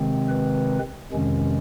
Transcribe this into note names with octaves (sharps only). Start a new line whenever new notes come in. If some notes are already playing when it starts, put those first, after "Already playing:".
Already playing: C3 D#3 G#3 C4
B4
F2 C3 D#3 G#3 C#4